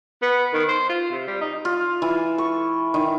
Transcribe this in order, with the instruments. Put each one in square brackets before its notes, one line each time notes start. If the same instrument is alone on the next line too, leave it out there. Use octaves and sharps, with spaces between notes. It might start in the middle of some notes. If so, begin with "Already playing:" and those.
[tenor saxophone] B3
D#3
C5
F4
C3
G3
D#4
[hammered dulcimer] F4
E3
C#6
D#3